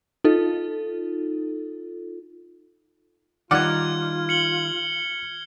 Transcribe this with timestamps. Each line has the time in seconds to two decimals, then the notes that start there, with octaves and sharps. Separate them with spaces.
0.24 D#4 F4 A4
3.51 D#3 G3 D#4 F4 D5 F#5 F6 G#6
4.29 C#7 F#7 G7